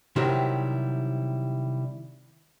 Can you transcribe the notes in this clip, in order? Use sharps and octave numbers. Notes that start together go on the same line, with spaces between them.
C3 D#3 F#3 G3 E4 G4